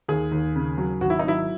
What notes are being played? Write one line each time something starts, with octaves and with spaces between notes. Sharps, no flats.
D#2 G#4
D#2
C#3
F#3
G#1 F#4
E4
D#4
F#3 E4